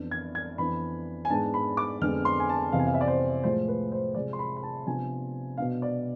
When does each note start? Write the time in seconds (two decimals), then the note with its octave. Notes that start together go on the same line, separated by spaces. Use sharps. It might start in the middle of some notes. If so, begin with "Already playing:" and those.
Already playing: F2 E3 B3 D4
0.11 G#6
0.35 G#6
0.58 F2 E3 B3 D4 B5
1.25 G#5
1.30 G#2 G#3 B3 D4 A5
1.54 B5
1.77 D6
2.01 F2 D3 G#3 B3 F6
2.25 C6
2.40 G#5
2.49 A5
2.72 F2 C3 E3 B3 F5
2.80 G#5
2.87 F5
2.94 E5
3.01 D5
3.08 C5
3.44 A2 F3 G#3 C5
3.68 B4
3.92 C5
4.15 C3 F3 G#3 D5
4.33 C6
4.39 B5
4.56 B5
4.63 A5
4.86 C3 F3 B3 D4 G#5
5.57 B2 B3 D4 F5
5.82 D5